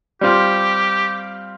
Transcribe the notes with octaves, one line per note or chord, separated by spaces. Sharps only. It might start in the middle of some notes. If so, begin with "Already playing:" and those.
G3 C4 F4 G4